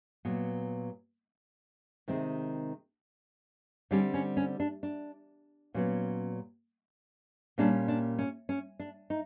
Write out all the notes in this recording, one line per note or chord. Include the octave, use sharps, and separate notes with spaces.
A#2 F#3 B3
C3 D#3 G#3 C4
D3 G3 C4 C#4
C#4
C#4
D4
D4
A#2 F#3 B3 C#4
A#2 G3 A#3 C#4 D4
D4
C#4
C#4
D4
D#4